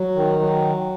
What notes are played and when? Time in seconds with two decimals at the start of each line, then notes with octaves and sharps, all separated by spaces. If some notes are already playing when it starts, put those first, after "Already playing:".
Already playing: F#3
0.15 D#3
0.39 F#3